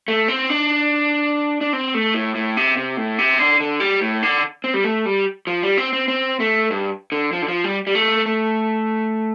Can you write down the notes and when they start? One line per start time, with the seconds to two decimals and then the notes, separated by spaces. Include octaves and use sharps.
0.08 A3
0.28 C4
0.50 D4
1.61 D4
1.73 C4
1.94 A3
2.14 A2
2.35 A2
2.57 C3
2.77 C3
2.97 A2
3.18 C3
3.39 D3
3.60 D3
3.80 G3
4.01 A2
4.23 D3
4.64 C4
4.74 G3
4.84 A3
5.06 G3
5.47 F3
5.63 G3
5.78 C4
5.93 C4
6.08 C4
6.40 A3
6.70 G2
7.12 D3
7.33 F3
7.42 D3
7.48 F3
7.64 G3
7.87 G3
7.95 A3
8.26 A3